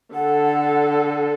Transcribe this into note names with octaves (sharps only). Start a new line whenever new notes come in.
D3 A4 F#5